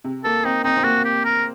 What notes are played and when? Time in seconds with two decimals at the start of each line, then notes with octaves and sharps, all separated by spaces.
0.04 C3
0.24 A#3 A4
0.45 C4 D#4
0.64 C4 D#4
0.77 C4
0.84 A#3 F#4
1.05 G4
1.25 A#4